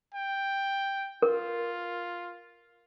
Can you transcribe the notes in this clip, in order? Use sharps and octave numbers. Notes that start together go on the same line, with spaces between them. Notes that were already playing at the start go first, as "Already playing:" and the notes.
G5
F4 A#4